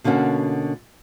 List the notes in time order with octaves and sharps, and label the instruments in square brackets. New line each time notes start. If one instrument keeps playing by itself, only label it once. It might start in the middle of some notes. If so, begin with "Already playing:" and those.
[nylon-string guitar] B2 D3 A#3 C#4 F#4